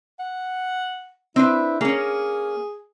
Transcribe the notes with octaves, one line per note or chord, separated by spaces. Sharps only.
F#5
C4 D4 E4 B4
A#3 C#4 G#4